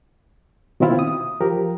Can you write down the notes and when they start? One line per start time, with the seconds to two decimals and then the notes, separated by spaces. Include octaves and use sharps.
0.80 B2 D#3 A#3 C4 E4 F4
0.99 D#6
1.41 F3 G4 A#4